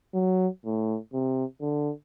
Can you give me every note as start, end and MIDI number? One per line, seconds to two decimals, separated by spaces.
0.14 0.48 54
0.65 0.98 45
1.14 1.45 48
1.61 1.91 50